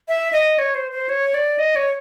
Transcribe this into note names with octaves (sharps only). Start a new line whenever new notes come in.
E5
D#5
C#5
C5
C5
C#5
D5
D#5
C#5